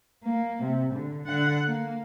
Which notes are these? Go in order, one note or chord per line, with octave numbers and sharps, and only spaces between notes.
A#3
C3
D3
D3 F#5
A#3